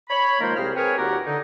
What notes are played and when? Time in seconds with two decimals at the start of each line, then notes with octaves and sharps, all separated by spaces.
0.10 C#5 B5
0.40 D#3 F3 G#3 A#3 A#4 C5
0.56 C2 C3 G#4 C5 F6
0.75 C4 G#4 A#4 B4 C#5 G#5
0.98 D#2 A#2 F#4 G4 A#4 F#5
1.26 D3 D#4